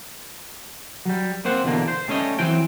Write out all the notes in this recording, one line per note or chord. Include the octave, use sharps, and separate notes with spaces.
F#3 G3
A#3 C4 C5 F#5
E2 B2 D3 A#3
C5
G3 A3 C#4 C#5 D#5
E3 F#3 C4 G5